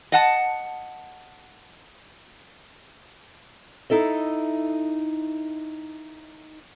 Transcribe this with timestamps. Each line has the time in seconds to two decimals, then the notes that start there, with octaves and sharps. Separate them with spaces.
0.12 D#5 F#5 A5
3.90 D#4 E4 A4 D#5